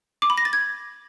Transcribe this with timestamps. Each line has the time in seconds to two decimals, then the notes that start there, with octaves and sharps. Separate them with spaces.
0.22 D6
0.30 B5
0.38 A#6
0.45 A6
0.53 G#6